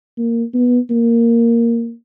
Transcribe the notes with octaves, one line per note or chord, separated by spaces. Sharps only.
A#3
B3
A#3